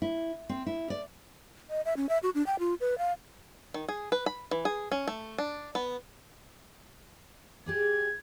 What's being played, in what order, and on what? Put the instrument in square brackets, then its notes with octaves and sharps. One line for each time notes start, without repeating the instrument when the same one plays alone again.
[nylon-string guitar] E4
C4
E4
D5
[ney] D#5
E5
C#4
E5
F#4
D4
G5
F4
B4
F5
[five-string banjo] D#3
G#4
B4
B5
E3
G#4
C#4
A3
D4
B3
[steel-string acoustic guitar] G4 G#4 D5 [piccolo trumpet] G#6